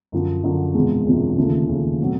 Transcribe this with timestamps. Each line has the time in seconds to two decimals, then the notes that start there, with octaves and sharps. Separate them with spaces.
0.12 F#2 D3 F3
0.43 F#2 D3 F3
0.74 E1 E2 C3 F3 G#3
1.06 E1 E2 C3 F3 G#3
1.37 D#2 C#3 F3 A3 C#4
1.68 D#2 C#3 F3 A3 C#4
2.01 B2 F#3 A3 C4